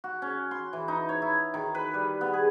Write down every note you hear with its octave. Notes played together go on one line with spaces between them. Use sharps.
F#4
C#4
C6
E3
D#4
C#5
E4
D#3
B4
G3
B3
G#4